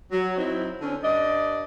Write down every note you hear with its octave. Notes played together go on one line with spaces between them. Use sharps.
F#3
F#3 C4 D#4 E4
D3 C4 C#4
G2 D5 D#5